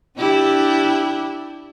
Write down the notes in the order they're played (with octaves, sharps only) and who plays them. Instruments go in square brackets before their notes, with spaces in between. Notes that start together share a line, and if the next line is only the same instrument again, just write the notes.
[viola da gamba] D4 E4 G4